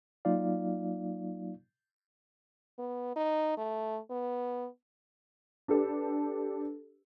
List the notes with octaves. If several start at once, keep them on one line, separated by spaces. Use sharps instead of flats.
F#3 A#3 D#4 F4 D5 F5
B3
D#4
A3
B3
D4 G4 A4 B4